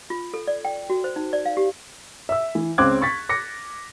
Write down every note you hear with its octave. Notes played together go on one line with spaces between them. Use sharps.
F4
A4
D5
G5
F#4
C5
D#4
D5
F5
G4
E5 E6
E3
C#2 C#3 C4 D6 F#6 G#6
C#6 A6 B6
D6 A#6 C#7